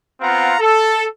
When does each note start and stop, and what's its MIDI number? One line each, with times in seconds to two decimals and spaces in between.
0.21 0.55 59
0.21 0.55 60
0.21 0.55 65
0.21 0.55 77
0.21 0.55 78
0.21 0.55 82
0.60 1.06 69